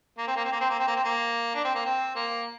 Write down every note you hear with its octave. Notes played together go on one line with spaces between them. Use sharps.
A#3
C4
A#3
C4
A#3
C4
A#3
C4
A#3
C4
A#3
D4
C4
A#3
C4
A#3